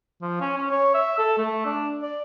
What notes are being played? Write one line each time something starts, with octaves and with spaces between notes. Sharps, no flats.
F3
C#4
C#4
C#5
E5
A4
A3
D4
D5